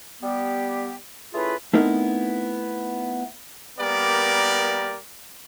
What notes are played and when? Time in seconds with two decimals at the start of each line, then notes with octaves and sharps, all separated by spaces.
0.22 G3 B3 G4
1.34 A3 C#4 E4 F4 G#4 B4
1.73 A3 B3 C4 D#4 E4 A#4
3.79 G3 A#3 B3 G4 A#4 D5